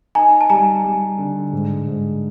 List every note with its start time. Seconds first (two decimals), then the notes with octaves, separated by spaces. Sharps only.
0.15 D#4 G#5 A#5
0.41 A5
0.50 G3 G#5 A#5
0.84 G3
1.18 D3
1.53 G#2
1.87 G#2